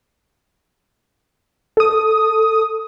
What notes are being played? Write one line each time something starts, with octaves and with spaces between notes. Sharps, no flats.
A4 D#6